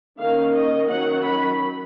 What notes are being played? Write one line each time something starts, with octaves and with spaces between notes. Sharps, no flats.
D#3 A#3 C#4 F5
D#5
D#3 F#3 C#4 F#5
B5